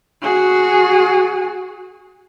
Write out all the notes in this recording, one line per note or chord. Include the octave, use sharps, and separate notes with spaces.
F#4 G#4